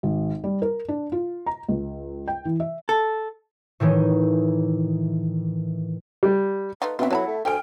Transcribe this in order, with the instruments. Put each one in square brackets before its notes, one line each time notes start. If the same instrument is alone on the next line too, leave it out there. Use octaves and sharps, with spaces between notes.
[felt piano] G#1
G3
A#4
D4
F4
A#5
C#2
G5
E3
E5
[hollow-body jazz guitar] A4
[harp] A2 D#3 E3 D#4
[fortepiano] G3
[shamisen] A3 D#4 F4 [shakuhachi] B4
[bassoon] B2 [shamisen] F#3 F4 [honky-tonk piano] B3 C4 [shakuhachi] E5
[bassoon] F#3 [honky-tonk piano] E4 A4 [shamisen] B4 A5 B5 [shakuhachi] F#5
[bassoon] A3
[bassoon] D2 [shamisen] F3 A4 [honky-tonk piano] G5 F6 D7 [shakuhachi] G#5